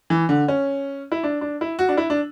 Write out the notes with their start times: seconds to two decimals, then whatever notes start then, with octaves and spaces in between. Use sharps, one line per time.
0.10 E3
0.29 D3
0.48 C#4
1.12 E4
1.24 D4
1.41 D4
1.61 E4
1.79 F#4
1.89 D4
1.97 E4
2.10 D4